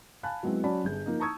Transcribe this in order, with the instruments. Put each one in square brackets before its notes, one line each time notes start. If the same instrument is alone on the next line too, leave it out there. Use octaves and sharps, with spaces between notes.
[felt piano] F5 G#5 A5 B5 F#6
F#3 G#3 B3 C4 E4
F#3 C#4 D5 A5 B5
G1 G#4 G6
F3 A#3 D#4
A5 A#5 C#6 D#6 E6 G#6